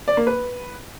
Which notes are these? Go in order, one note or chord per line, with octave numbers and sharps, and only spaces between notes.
D5
A#3
B4